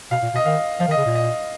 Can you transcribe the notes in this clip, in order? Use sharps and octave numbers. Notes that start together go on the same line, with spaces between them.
B2 F5
A#2
B2 D#5
D#3 F5
F3 F5
D#3
D#5
C#3
A#2
D#5